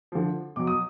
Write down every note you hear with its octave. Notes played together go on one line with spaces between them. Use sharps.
D3 F3
B2 F#3 D6
D#6